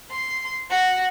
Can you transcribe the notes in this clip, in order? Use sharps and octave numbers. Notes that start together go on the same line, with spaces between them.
C6
F#4